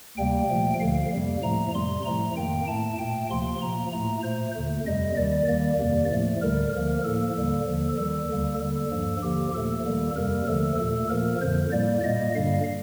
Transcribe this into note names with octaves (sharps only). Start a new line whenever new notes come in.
D2 C3 G3 A#3 G5
A#2 F3 A3
D2 D3 F3 F5
F2 C3 G3 A#3
A2 F3 A3 A#5
F2 C3 G3 C6
A2 F3 A3 A#5
F2 D#3 A#3 G5
A2 A3 A5
A#2 A3 G5
D2 C3 F3 A#3 C6
A#2 F3 A#3 A#5
A2 A3 A#5
A#2 A3 C5
D#2 D3 A3
F2 C3 G3 D#5
D#2 D#3 G3 D5
D#2 D#3 G3 A#3 D5
F2 C3 D#3 A#3
A2 F3 A3
D2 D3 G3 A#4
D2 D3 F3 A#3 A#4
A2 F3 A#3 A4
D#2 D3 G3 A#3
D#2 D3 F3
D#2 D#3 G3 A4
D2 D3 G3 A#3
D#2 D3 G3 A4
G2 F3 A#3
D#2 D3 F3 A#3 G4
A#2 F3 A3 A4
D#2 D#3 G3 A#3
F2 C3 G3 A#3 A#4
D#2 D3 F3 A3 A4
A#2 A3 A4
A#2 F3 A#3 A#4
F2 D3 F3 C5
A2 G3 A#3 D5
A#2 G3 A#3 D#5
G2 D3 G3 F5